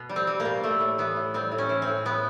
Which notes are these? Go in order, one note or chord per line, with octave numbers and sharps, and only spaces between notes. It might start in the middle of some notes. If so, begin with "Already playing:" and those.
Already playing: B2
G3
C4
G3
A#3
B2
G3 A3
A2
E3 B3
A2
G3 C4
A2
C#4
E3
C4
A2
G#3 B3